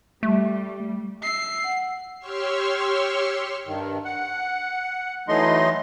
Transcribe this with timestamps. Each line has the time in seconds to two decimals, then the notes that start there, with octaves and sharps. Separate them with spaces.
0.23 G3 A3
1.23 E5 C7
1.64 F#5
2.19 G4 C#5 C6 C#6 E6 F6
3.66 G2 D#3
4.05 F#5
5.28 E3 F#3 A3 D#4 D#5 C6